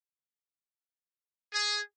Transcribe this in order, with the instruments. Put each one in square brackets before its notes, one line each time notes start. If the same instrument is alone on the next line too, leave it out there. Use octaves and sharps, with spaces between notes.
[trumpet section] G#4